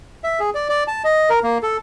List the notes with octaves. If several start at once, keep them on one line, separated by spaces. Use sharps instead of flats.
E5
G#4
D5
D5
A5
D#5
A#4
A#3
A4